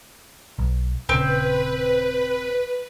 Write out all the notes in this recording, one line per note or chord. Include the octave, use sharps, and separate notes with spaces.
B1
D#1 C#3 C4 B4